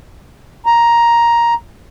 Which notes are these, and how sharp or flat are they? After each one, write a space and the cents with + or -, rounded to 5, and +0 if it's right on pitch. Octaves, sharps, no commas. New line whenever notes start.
A#5 +10